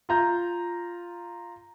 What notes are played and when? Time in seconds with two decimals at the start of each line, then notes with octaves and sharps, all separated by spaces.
0.09 F4 A#5 G6